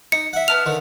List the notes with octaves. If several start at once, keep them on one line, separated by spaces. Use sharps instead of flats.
D#4 C#7
E5 F#5
B3 A5 F6 F7
D3 D#3